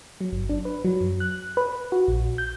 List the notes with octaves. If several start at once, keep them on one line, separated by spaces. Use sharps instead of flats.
F#3
G1
D4
B4
F#3
F#2
F#6
B4
F#4
A#1
G6